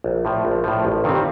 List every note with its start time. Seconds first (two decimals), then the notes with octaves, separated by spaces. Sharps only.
0.04 A#1
0.25 A2 F3
0.45 A#1
0.64 A2 F3
0.85 A1
1.04 G2 D#3 G3 C4